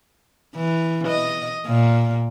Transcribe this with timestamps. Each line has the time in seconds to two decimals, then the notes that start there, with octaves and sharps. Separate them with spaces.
0.56 E3
1.07 D#5
1.66 A#2